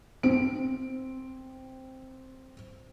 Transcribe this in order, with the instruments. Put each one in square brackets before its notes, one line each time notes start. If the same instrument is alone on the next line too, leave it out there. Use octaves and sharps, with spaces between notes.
[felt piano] C4 D7